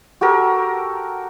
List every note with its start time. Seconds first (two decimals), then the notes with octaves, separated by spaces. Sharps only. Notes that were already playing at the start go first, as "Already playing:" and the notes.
0.21 F#4 G4 A4 A#4